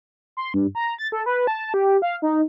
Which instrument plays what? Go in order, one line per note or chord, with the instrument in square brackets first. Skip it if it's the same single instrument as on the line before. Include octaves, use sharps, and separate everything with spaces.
[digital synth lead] C6
G2
A#5
A6
A4
B4
A5
G4
F5
D#4